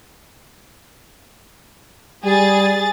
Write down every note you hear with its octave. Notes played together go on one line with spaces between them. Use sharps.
G3 G#4 A6